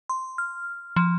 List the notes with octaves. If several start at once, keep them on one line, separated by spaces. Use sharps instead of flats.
C6
F6
F3